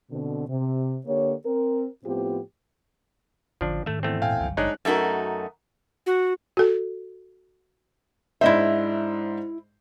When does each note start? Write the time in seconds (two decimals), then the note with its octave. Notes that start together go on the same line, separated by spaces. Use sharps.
0.11 B2 D3 C4
0.49 C3
1.06 D3 A#3 G4 C#5
1.46 C4 A#4
2.05 A2 F3 B3 C4 F4 G4
3.61 D1 G#1 D3 F3 C#4 D4
3.86 G#2 D#3 A3 D4 E5
4.03 E2 A3 C4
4.22 A#2 F5 G5 G#5
4.40 G1 C#2 F#3
4.57 G#1 G#3 D4 D#4 C#5 F#6
4.85 F#2 A3 D#4 F#4 A#4
6.06 F#4
6.57 F#4 A4
8.41 G#2 D4 E4 C5 D#5 E5